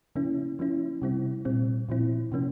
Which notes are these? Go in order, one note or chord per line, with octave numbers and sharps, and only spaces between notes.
C#3 F3 A#3 C#4 E4
F3 A#3 C#4 E4
C3 G3 C4 E4
A#2 G3 C4
A#2 F3 C4 E4
C3 F3 A#3 C#4